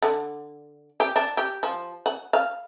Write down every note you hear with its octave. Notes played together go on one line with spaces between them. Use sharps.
D3
G4
D4
G4
F3
F#5
F5